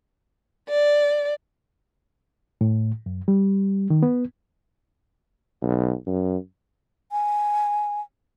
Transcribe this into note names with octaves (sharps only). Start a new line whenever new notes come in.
D5
A2
F#2
G3
D#3
B3
B1
F#2
G#5